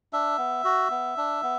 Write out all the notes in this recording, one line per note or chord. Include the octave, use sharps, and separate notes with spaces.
D4 E5
B3
F#4
B3
D4
B3